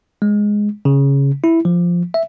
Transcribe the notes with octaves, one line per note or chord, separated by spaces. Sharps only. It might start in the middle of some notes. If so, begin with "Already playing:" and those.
G#3
C#3
E4
F3
E5